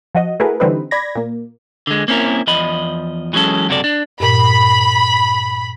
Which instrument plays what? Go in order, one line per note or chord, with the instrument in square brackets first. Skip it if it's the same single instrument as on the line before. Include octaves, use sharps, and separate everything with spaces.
[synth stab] F3 F#4 D#5
A3 E4 F#4 G#4 A#4 B4
D3 E3 G3 C4 D#4 B4
D5 B5 G#6 A#6
A#2 A#3
[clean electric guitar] D3 G#3
A#3 C4 C#4 E4 A#4
E2 F3 D#5 B5
E3 F#3 G#3 C#4 A4
C#2 F#2 C3 F#4 A4 D5
D4
[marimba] G2 A#2 [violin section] B5